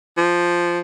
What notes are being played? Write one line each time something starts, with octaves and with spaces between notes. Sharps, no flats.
F3